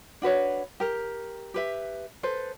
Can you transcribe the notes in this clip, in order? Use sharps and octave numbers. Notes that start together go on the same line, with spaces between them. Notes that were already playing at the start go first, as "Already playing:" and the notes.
D4 F#4 B4 C#5
G4 A#4
G4 B4 E5
A4 B4 C5